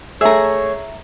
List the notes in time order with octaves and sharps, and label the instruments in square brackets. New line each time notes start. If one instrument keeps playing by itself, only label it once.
[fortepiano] A3 G#4 [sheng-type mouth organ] C#5 [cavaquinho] E5 A#5